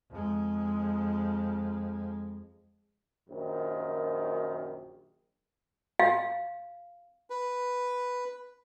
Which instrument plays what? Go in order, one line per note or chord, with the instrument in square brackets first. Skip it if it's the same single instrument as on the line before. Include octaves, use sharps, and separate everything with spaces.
[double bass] F2 G#3
[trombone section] A#1 F#2 D#3
[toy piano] F5
[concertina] B4